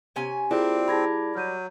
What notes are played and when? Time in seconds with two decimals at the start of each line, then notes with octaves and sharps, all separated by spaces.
0.16 C3 C#4 G#5
0.51 G3 A#3 C4 D4 E4 F4 G#4
0.88 E4 G#4 A5 B5 G#6 A#6
1.35 F#3 F6 G6 D#7